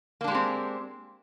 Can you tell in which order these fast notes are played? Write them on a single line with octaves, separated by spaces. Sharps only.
A#3 D4 G#3 G4 C4